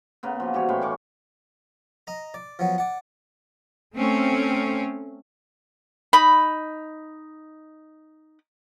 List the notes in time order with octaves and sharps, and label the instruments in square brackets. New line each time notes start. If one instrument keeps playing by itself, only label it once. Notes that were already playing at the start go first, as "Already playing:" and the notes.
[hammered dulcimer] C#3 A#3 B3
F3 F#4
E3 G3 G4 C#5
A2 C#4 C5 B5
B2 C#4 C#6 D6
[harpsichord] D#5 A#5
D5
F3 F#3 B3
D5 F#5
[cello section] A3 C4 C#4
[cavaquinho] D#4 B5